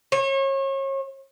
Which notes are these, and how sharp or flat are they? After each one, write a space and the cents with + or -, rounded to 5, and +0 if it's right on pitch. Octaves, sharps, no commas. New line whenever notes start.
C#5 -35